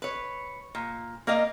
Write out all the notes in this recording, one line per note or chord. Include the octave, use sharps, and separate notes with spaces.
B4 C#5
A#2
A#3 A#4 D5 D#5 F5